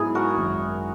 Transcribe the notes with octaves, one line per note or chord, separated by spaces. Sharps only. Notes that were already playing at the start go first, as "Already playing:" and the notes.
Already playing: G#2 F#3 B3 E4 G#4
F#4 A#4
G#1 F#2 D#3 G#3